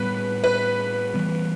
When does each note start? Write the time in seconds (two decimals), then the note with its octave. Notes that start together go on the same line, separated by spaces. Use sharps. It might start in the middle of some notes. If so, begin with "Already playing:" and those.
Already playing: A2 G3 B3 B4
0.44 B4
1.14 E3 G3 B3